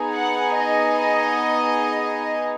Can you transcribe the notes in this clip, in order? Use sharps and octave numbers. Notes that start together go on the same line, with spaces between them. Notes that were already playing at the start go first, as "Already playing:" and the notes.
Already playing: B3 D#4 G#4
F#5
D#5